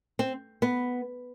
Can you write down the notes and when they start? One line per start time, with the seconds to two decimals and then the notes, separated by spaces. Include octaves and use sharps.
0.19 C4
0.62 B3